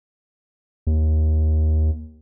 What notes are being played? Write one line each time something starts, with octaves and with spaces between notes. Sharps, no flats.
D#2